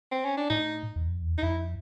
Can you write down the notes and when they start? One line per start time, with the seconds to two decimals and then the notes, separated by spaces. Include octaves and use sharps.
0.11 C4
0.25 C#4
0.37 D4
0.50 A2 D#4
0.96 E2
1.09 F2
1.22 E2
1.38 D#4
1.43 F2 E4